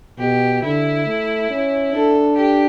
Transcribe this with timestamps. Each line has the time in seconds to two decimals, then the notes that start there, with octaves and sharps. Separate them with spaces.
0.18 B2 G4
0.62 D3 E4
1.06 A3
1.50 C#4
1.93 D4 A4
2.37 G4